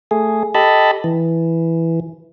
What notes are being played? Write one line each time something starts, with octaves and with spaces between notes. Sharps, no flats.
A3 G#4
G4 A4 D#5 A5 B5
E3